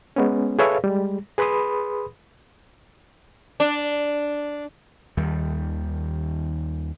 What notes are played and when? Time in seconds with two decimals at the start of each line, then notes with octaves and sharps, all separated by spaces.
0.16 G#3 B3 C#4
0.59 G#4 A4 B4 C#5 E5 F5
0.84 G3 G#3
1.38 G#4 B4 B5 C6 D#6
3.60 D4
5.17 D#2 D#3 G3